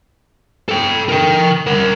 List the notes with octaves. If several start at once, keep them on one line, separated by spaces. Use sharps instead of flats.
A4 G5
A#4 G5
A#4 F#5